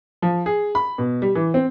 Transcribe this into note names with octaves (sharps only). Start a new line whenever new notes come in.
F3
G#4
B5
B2
G3
E3
C4